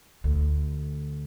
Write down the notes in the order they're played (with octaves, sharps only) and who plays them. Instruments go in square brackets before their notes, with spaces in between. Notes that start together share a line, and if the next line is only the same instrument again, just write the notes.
[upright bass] D2 D3